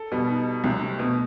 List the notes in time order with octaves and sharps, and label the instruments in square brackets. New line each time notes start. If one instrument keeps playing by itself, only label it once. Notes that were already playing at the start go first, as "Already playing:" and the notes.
Already playing: [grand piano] A4
[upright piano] B2 [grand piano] G3
[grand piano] D#4
D#4
[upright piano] C2 C3 [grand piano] F#3
[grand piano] A3
[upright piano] B2 [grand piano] A3